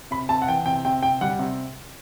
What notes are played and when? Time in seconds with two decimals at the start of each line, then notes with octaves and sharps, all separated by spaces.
0.11 C3 B5
0.29 C3 A5
0.42 F#5
0.48 E3 G5
0.66 C3 G5
0.85 C3 G5
1.03 C3 G5
1.21 G3 F#5
1.39 C3